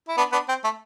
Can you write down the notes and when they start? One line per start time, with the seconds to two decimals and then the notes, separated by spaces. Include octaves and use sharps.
0.08 E4
0.17 B3 D4
0.33 B3 D4
0.49 C4
0.64 A3